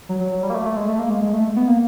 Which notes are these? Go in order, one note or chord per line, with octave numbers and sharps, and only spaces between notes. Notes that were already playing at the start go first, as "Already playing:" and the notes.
F#3
F#3
F#3
G3
A#3
A3
A3
G#3
A3
A#3
G#3
G#3
A3
B3
A#3